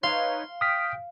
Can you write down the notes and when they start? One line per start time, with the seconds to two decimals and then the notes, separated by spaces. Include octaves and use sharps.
0.03 D#4 B4 C#5 F5 C6
0.61 G5 D#6 F6 B6